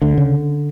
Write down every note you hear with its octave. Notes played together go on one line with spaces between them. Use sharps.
D2 D3
C#3